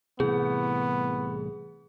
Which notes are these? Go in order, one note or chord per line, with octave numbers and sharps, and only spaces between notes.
C2 A2 C3 E3 B3 G#4